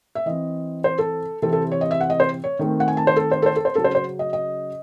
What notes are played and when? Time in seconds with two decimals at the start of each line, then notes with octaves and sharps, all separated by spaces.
0.15 E5
0.26 E3 C4 D#5
0.84 C5
0.98 A4
1.42 C3 E3 C4 A4
1.53 A4
1.71 C#5
1.81 D#5
1.91 E5
2.01 F#5
2.10 D#5
2.20 C5
2.44 C#5
2.59 D#3 A3 C4
2.80 F#5
2.88 G#5
2.97 A5
3.07 C5
3.16 A4
3.31 C5
3.42 A4
3.46 C5
3.56 A4
3.65 C5
3.75 C#3 F#3 C#4 A4
3.84 C5
3.95 C5
4.19 D#5
4.33 D#5